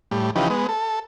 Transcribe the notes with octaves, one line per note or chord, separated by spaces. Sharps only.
A2 G3
C#3 E3 F3 D#4 G4 B4
G#3 B3
A4